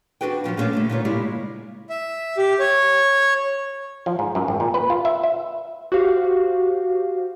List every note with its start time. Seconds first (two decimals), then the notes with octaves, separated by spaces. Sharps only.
0.21 C4 D4 F#4 G#4 B4 G5
0.44 A#2 F3 F#3 C#4
0.57 A#2 G#3 A3 C#4 D4 F5
0.73 D3 G3 A3
0.89 A#2 D#4 F4 C#5
1.05 C#3 G3 G#3 A#3 E4
1.90 E5
2.37 G4
2.60 C#5
4.06 F3
4.19 G#2
4.35 F#2
4.48 G#1
4.60 A#2
4.74 B4
4.90 F4
5.05 E5
5.23 E5
5.92 F#4 G4 C5 F5